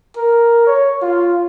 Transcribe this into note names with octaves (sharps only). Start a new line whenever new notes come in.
A#4
C#5
F4